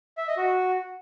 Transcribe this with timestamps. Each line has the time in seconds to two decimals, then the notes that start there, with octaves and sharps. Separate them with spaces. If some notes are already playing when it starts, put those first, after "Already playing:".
0.18 E5
0.28 D#5
0.37 F#4